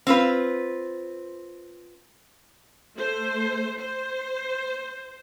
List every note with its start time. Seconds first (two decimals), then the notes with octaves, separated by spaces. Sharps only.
0.07 C4 F4 B4
2.96 A3 C5
3.77 C5